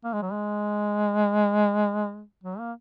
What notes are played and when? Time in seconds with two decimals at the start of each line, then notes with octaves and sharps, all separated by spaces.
0.04 A#3
0.13 G#3
0.22 F#3
0.32 G#3
2.43 F#3
2.59 A#3